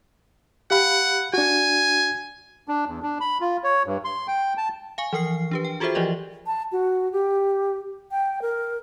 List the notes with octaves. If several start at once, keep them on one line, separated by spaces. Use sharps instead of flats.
G4 F5 F#5 B5
D4 F#4 G#5
D4
E2
D4
B5
F4
C#5
G2
C6
G5
A5
F5 G#5 C#6
E3 F3 A#4 F6 C7
D4 G4 B4
G5
F4 F#4 G#4 A4 C5 E5
E3 F3 G4 D5 D#5
A5
F#4
G4
G5
A#4